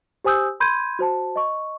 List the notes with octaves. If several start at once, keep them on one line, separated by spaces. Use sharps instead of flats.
G4 C5 G#5 D#6 E6 G6
B5 C6 G6 G#6 D#7
F#4 C5 A5
D#5 C#6